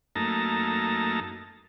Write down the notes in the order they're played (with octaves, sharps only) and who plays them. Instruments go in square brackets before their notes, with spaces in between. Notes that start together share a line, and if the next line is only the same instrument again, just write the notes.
[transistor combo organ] F#2 A3 A#3 D#4 A5 A#5